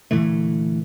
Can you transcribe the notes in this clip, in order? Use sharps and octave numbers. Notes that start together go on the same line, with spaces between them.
A#2 D3 E3 A3